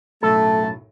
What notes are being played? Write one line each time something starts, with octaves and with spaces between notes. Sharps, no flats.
B1 F#2 A2 A3 A4 A5